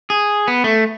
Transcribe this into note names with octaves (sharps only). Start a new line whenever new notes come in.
G#4
B3
A3